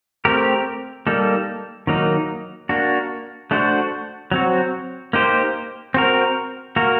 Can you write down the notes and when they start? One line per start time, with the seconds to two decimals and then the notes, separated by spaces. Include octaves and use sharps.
0.25 A3 C4 G4 A#4
1.07 G3 A#3 D#4 A4
1.87 D#3 F#3 A#3 D#4
2.69 A#3 D4 F#4
3.51 A3 D4 F#4 C5
4.32 F#3 C4 F#4
5.13 A#3 D#4 G4 C5
5.94 C4 F#4 A#4
6.76 A#3 F#4 A#4